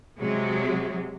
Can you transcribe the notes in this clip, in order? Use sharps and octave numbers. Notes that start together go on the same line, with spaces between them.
C3 F#3 G#3